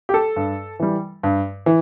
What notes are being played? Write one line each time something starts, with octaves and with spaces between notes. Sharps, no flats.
G4
A4
G2
E3 G3
G2
E3